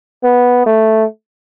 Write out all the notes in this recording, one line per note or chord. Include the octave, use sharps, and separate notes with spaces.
B3
A3